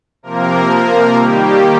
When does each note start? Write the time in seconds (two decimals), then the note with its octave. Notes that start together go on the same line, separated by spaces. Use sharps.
0.23 C3 F3 A#3 A#4
1.16 D#3 G3 A#3 G4